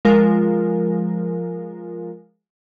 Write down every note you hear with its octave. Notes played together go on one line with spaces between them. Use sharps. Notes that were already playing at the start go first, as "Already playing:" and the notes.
F3 G#3 F4 A#4